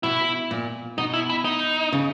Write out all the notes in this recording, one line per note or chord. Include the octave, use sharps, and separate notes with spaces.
B2 E4
A#2
B2 D#4
E4
E4
D#4
C#3